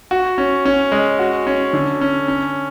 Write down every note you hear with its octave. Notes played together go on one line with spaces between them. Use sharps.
F#4
C#4
C#4
G#3
F#4
C#4
D3
C#4
C#4